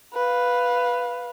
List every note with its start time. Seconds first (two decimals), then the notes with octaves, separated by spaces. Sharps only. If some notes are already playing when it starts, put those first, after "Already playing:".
0.14 B4 F5